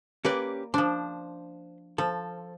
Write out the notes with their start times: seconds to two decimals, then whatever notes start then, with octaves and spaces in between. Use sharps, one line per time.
0.25 A#3 C#4 G4 B4 D5
0.74 F3 D4 C5
1.98 F3 A4